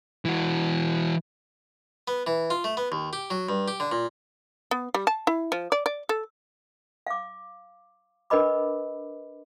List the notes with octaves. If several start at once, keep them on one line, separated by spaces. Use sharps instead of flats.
E3 F#4
B3
E3
F4
A3
B3
D#2
G4
F#3
G2
G4
D3
A#2
B3
G3
A5
E4
F3
D5
D5
A4
F5 D6
D4 A#4 B4 D#5 B5 D6